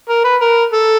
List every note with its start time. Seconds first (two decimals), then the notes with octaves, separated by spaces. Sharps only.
0.09 A#4
0.24 B4
0.41 A#4
0.73 A4